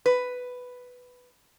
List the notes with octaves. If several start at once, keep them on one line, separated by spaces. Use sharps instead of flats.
B4